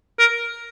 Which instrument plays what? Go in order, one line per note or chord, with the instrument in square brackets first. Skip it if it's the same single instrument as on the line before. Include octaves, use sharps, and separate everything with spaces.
[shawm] A#4